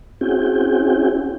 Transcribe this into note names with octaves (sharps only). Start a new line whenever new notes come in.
C4 C#4 E4 F#4 G#4 G5